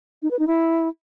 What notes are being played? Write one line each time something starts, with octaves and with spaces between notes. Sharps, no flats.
D#4
B4
D#4
E4